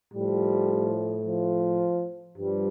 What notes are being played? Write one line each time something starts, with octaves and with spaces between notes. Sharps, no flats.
A2 F3 G3
F3
G2 F3 G3